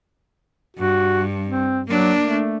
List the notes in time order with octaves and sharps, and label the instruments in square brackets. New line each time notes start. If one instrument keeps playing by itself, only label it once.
[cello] G2 [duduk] F#4
[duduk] C4
[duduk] F#3 [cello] A#3 D4
[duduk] A3